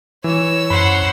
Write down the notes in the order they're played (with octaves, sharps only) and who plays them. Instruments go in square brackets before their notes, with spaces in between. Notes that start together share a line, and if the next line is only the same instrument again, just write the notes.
[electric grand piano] E3 [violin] C#5 E6
[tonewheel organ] F#2 [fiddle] C5 F#5 [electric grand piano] B5